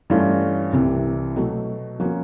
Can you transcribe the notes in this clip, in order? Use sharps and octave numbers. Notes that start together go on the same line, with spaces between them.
G2 E3 A3 C#4 F4
C2 C3 E3
B2 F#3 A3
F3 A#3 C#4 F#4